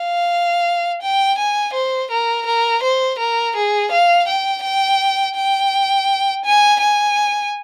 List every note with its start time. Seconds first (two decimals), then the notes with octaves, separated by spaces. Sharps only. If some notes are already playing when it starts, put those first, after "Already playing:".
Already playing: F5
1.02 G5
1.38 G#5
1.73 C5
2.11 A#4
2.46 A#4
2.83 C5
3.19 A#4
3.56 G#4
3.92 F5
4.28 G5
4.64 G5
5.36 G5
6.45 G#5
6.81 G#5